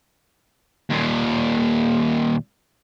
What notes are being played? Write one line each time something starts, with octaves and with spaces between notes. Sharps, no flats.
D#2 A#2